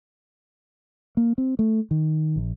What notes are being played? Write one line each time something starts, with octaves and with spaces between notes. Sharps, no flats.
A#3
C4
A3
D#3
A#1